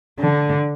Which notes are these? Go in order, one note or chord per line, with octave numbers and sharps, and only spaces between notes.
D3